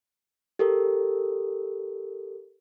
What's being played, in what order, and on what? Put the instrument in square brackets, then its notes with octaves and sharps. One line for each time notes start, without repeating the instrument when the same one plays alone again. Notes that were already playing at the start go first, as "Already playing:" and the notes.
[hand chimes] G4 A4 A#4